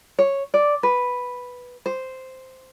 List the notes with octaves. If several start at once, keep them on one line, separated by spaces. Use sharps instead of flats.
C#5
D5
B4
C5